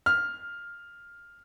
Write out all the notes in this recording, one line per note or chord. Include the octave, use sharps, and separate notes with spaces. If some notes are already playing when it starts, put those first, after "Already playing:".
F6